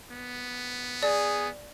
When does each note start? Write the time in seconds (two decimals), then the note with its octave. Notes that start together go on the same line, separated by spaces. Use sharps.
0.11 B3
1.03 G#4 D5